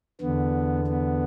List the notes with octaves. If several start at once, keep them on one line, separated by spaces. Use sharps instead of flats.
E2 D3 B3
B3